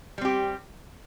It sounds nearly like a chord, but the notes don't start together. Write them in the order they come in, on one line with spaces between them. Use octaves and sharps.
G3 C4 G4